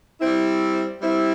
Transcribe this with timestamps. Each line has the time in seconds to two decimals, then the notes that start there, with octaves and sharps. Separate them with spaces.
0.21 G3 C4 E4
1.00 G3 C4 E4